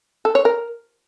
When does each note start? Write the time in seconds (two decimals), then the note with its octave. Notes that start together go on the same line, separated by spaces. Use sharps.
0.25 A4
0.35 C#5
0.45 A#4